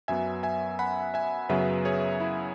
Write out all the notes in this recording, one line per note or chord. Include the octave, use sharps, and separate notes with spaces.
F#2 F#3 B3 E5 G#5
E5 G#5
F#5 B5
E5 G#5
F#2 C#3 F#3 B3 B4 E5
G#4 C#5
E4